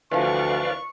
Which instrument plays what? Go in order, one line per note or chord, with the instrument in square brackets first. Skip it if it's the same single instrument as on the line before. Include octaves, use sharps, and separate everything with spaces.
[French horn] D2 [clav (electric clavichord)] E3 F3 [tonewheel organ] B4 D5 F5 [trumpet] C#6